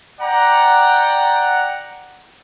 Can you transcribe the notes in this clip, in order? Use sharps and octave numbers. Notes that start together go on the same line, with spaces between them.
D5 F#5 G5 A#5